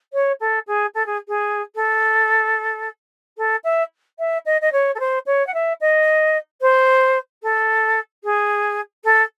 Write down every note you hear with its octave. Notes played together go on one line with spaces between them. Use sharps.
C#5
A4
G#4
A4
G#4
G#4
A4
A4
E5
E5
D#5
D#5
C#5
A4
C5
C#5
F#5
E5
D#5
C5
A4
G#4
A4